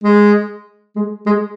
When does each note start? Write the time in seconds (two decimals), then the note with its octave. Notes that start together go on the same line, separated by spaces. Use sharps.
0.04 G#3
0.96 G#3
1.26 G#3